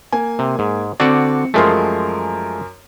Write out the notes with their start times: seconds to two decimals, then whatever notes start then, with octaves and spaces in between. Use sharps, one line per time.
0.12 A#3 G#5
0.39 C3
0.59 G#2
1.00 D3 C4 F#4 D5 C#7
1.54 F#2 F3 G#3 A3 A#4 C6